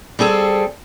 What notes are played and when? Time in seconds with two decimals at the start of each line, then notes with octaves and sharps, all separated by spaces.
0.19 G3 C4 G#4 A4